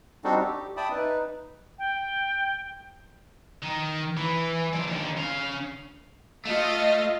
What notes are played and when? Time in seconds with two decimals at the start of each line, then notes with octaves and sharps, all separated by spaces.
0.24 G3 C4 D4 D#4 F#4 A4
0.40 G4
0.77 D5 E5 G5 A5 B5 D#6
0.91 D#4 B4
1.78 G5
3.63 D#3
4.17 E3
4.73 F3 D5
4.87 D#2 D3
5.17 C#4 F5
6.45 A3 F4 D#5 F5